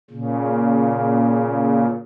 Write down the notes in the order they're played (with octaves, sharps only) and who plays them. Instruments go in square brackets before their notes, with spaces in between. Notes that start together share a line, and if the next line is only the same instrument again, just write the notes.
[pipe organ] A#2 C#3